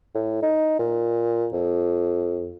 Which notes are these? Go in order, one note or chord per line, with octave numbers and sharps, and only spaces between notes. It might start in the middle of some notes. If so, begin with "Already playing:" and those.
A2
D#4
A#2
F2